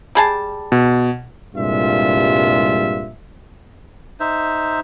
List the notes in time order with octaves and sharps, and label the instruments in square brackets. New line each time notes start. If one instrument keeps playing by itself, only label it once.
[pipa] G3 G#4 A5
[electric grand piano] B2
[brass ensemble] C2 G2 A#2 G#3 F4 E5
[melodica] D#4 C5 E5